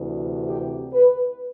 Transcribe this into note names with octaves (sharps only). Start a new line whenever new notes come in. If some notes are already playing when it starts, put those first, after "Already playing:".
Already playing: D2 C3 E3
G4
B4